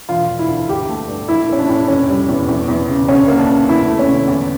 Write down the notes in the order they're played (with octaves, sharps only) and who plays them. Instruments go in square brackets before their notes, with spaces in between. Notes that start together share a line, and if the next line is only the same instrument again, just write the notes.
[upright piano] E1 F4
E1
E4
D2
G1 G4
A3
G2
A#1 E4
A#3 C#4
D4
A2
D4
F1 C#4
G3
E2
E2
E2
C#3
D2 C#4
A#3
D4
C#3
E2 E4
A3
C#4
D3
E2